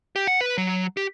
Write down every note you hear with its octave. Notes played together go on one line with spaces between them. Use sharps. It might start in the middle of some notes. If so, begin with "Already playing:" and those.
G4
F#5
B4
F#3
G4